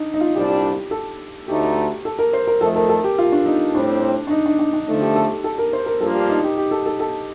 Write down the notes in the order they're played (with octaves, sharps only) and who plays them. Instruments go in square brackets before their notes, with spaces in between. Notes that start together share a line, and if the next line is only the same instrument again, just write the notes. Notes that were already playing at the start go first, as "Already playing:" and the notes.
Already playing: [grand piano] D4 D#4
D#4
F4
[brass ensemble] C2 A#2 G3 D4 [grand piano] G4
[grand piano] A4
[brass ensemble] D2 D3 A3 D#4 [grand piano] G4
[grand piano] A4
A#4
C5
A#4
[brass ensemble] F2 D#3 A3 [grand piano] A4
[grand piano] A#4
A4
G4
F4
D4
D#4
[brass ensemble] A2 G3 C4 [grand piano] D4
[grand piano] D4
D#4
D4
D4
D4
[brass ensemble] D3 F3 A3 [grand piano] D#4
[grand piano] G4
A4
A4
A#4
C5
A#4
[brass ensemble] G2 F3 A#3 D4 F4 [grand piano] A4
[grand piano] G4
D#4
G4
G4
A4
A4
A4